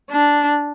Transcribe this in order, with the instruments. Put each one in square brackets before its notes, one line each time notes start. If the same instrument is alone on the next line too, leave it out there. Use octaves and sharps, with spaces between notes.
[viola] D4